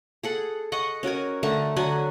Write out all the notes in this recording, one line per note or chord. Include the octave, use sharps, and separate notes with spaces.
G#4 A4 F#5
D#5 F#5 C#6
C#4 F#4 A#4 G#5
D3 A3 A5 A#5
D3 F#3 F#4 G#5